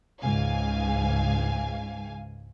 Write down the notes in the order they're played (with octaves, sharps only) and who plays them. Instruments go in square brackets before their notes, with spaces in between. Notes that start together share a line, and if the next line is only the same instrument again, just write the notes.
[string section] C#2 G#2 F5 G#5